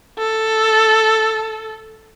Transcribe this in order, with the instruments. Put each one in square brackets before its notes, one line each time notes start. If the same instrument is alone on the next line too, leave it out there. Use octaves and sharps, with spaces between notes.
[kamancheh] A4